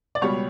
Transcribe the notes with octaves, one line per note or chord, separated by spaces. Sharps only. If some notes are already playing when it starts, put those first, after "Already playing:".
D5
C#2 B2 G3 C#5